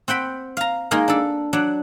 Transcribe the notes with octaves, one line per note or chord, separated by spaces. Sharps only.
C4 F#5 G5 B5
F5 A#5
G#3 A#3 D#4 A#4
D4 A4
F#3 D4 F#5